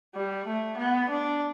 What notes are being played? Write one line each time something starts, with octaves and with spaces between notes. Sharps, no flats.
G3
A3
B3
D4